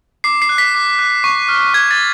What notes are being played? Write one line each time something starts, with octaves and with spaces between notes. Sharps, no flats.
D6 C7
C7
F#6
B6
D6
F#6
C#6
F6
C#6 G#6
A6